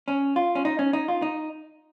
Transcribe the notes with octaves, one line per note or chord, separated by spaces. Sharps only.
C#4
F4
C#4
D#4
C#4
D#4
F4
D#4